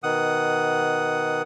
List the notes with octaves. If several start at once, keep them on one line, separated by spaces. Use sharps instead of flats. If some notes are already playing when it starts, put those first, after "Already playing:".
B2 D#3 F#5 D#6